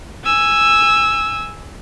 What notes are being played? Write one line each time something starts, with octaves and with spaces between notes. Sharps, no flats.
G#5 E6